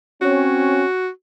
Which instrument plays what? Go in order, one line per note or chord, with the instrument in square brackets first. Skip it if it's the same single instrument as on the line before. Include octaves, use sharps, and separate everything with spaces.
[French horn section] C4 C#4 [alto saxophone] F#4